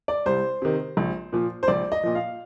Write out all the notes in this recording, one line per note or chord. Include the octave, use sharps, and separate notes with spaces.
D5
C2 C5
C3 D#3
A#1
A#2 F3
C5
A#1 D5
D#5
A#2 F3
F5